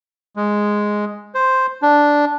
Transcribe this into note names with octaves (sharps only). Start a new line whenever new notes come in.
G#3
C5
D4